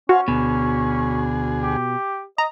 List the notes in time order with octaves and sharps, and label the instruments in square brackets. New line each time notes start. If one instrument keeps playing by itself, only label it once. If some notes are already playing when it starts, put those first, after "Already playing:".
[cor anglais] C#4 [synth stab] F#4 [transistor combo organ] C5 F5 G#5
[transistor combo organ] D2 G#4 [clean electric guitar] B2
[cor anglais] G4
[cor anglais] D#5 [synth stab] A#5